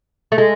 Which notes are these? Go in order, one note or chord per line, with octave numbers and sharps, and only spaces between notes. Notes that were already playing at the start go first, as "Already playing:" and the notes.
A3
G#3